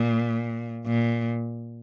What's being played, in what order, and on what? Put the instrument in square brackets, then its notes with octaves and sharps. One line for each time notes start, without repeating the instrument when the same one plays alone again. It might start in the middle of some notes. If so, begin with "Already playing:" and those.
Already playing: [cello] A#2
A#2